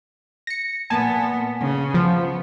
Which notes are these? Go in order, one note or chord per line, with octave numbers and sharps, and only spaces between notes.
A#6 C#7
A#2 B3 G#5 A5
C#3
F3 B3